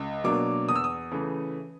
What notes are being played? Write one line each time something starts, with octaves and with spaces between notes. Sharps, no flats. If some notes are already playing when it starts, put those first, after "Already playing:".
Already playing: C#2
B2 F#3 A#3 D4 D6
E2 D#6
E6
D#6
C#3 E3 A3